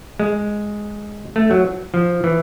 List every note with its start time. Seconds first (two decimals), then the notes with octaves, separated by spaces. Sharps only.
0.20 G#3
1.36 A3
1.51 F#3
1.94 F3
2.24 E3